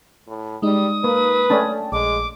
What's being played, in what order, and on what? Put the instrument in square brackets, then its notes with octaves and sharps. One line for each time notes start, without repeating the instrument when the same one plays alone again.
[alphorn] A2
[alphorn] G3 [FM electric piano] G#3 D#4 [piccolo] D#6
[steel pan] A#3 [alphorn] B4
[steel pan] A3 C#4 D4 [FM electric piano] G5 A5
[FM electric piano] A#1 [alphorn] G#3 [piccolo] D6